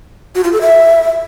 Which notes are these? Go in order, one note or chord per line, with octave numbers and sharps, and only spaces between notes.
F#4
F4
A4
E5